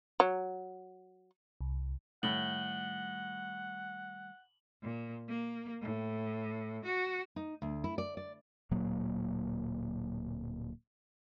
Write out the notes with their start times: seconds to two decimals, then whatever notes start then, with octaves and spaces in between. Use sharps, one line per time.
0.20 F#3
1.61 C2
2.23 A2 D#3 G3 A3 F#5 F#7 G7
4.82 A#2
5.28 A#3
5.82 A2
6.85 F#4
7.36 D#4
7.62 D2
7.84 E4
7.98 D5
8.17 D5
8.71 D1 A#2 F#3 A#3